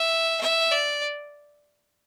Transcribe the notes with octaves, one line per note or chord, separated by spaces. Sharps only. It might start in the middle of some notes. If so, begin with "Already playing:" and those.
Already playing: E5
E5
D5